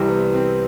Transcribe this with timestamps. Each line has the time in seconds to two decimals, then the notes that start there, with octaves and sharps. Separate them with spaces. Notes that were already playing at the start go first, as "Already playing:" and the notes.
Already playing: C2 C3 E3 G3 C4
0.09 B3
0.34 C4